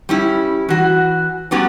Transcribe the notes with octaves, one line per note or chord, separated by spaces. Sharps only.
G3 C#4 E4
E3 F#4
F#3 G3 B3 C#4 F#4